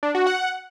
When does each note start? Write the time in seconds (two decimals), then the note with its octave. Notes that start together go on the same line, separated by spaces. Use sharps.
0.03 D4
0.15 F#4
0.27 F#5